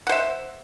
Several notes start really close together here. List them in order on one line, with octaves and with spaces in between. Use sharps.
F#5 C5 E5